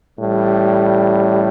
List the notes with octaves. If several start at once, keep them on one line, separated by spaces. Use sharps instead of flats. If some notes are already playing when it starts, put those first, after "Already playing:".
A1 A2 G3